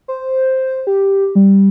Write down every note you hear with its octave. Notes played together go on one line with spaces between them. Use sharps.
C5
G4
G3